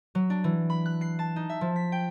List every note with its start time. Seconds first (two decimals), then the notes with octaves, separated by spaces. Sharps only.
0.15 F#3
0.30 D4
0.44 E3
0.70 B5
0.86 F#6
1.01 C7
1.19 A5
1.36 D#4
1.49 E5
1.61 F3
1.76 B6
1.92 G5